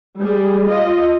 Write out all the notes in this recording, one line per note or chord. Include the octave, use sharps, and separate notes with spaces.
G3 G#4
F4 D#5